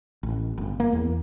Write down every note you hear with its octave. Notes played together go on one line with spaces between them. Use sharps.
A1
G1
A#3
E2